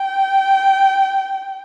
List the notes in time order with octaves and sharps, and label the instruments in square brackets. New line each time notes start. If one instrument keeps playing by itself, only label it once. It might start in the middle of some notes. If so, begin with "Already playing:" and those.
Already playing: [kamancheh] G5